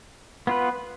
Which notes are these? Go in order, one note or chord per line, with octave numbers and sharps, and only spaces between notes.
B3 F4 B4